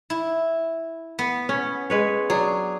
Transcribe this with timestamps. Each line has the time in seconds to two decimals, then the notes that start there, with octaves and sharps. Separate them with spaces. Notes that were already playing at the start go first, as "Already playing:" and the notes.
0.10 E4
1.19 B3
1.49 C#4
1.90 G#3 B4 C#5
2.30 F#3 D4 G#4